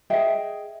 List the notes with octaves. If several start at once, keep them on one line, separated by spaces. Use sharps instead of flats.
G#4 D#5 E5 G5